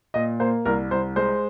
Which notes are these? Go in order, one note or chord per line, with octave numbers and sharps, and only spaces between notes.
A#2 D#5
A#3 C5
C2 A#4
C2 C5
G#3 C5